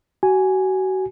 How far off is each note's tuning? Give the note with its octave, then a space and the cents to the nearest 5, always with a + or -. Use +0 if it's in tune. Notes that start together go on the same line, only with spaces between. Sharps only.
F#4 +35 G#5 +0